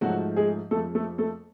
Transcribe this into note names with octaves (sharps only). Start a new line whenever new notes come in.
G#2 F3 F#3 A3 F#4
G#3 G#4
F2 F3 G#3 A3 A4
A3 A4
A3 A4